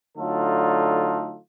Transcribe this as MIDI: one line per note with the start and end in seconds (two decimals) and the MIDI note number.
0.18 1.37 50
0.18 1.37 54
0.18 1.37 57
0.18 1.37 63
0.18 1.37 65
0.18 1.37 69